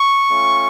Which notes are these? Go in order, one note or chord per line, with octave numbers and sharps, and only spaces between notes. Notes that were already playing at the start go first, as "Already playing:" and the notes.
Already playing: C#6
A3 C#4 F4